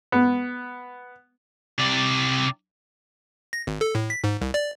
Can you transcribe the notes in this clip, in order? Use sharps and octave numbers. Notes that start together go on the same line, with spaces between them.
B3
C3 D5
A#6
G#1
A4
A2
B6
G#2
C2
D5